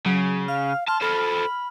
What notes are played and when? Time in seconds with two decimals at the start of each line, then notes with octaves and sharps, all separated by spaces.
0.06 C#3 F#3
0.48 F5 F6
0.88 A5 C6 F6
1.02 A4 C5 B5